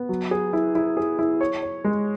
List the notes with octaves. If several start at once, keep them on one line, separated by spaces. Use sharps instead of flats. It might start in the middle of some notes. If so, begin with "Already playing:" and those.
Already playing: B3
F#3
G#4
E4
E4
G#4
E4
C#5
C#5
G#3